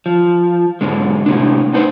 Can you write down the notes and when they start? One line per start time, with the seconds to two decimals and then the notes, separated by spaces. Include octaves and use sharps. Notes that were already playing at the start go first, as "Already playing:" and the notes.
0.06 F3
0.81 G#2 B2 D3 G#3
1.26 A2 C3 D4
1.73 B3 D#4 B4 C5